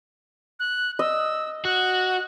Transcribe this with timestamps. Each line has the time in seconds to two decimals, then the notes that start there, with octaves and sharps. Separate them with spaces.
0.60 F#6
0.99 D#5 E6
1.65 F#4 F#6